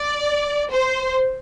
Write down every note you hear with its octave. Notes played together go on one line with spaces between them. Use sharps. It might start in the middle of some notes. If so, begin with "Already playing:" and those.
Already playing: D5
C5